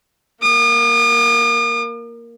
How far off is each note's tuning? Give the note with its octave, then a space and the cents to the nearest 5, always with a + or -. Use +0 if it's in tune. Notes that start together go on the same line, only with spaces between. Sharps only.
A#3 +0 D#6 -45